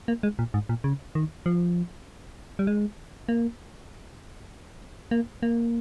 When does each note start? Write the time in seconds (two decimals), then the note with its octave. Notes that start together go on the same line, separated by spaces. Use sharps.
0.08 A#3
0.23 G#3
0.39 A#2
0.54 G#2
0.69 A#2
0.84 C#3
1.15 D#3
1.46 F3
2.59 G3
2.67 G#3
3.29 A#3
5.11 A#3
5.43 A#3